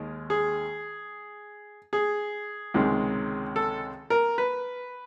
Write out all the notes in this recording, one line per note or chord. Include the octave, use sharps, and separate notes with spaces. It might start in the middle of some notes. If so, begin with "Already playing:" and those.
Already playing: D#2 D#3 G#3
G#4
G#4
C#2 C3 D#3 G#3
A4
A#4
B4